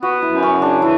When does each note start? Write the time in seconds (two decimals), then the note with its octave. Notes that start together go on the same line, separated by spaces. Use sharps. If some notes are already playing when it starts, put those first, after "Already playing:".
0.02 B3 F#4
0.22 E4
0.29 F#2
0.43 C#4
0.55 C#3
0.62 D4
0.81 E3 E4